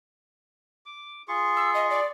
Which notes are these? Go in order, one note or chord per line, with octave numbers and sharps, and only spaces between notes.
D6
F4 G#4 C#6
E6
D#5
D5